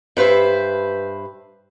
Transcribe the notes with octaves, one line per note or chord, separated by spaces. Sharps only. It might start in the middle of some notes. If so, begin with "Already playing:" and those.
G2 B4 C5 E5